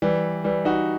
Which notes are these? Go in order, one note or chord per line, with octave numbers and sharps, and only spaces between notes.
E3 G3
E3 G3
D#4 F#4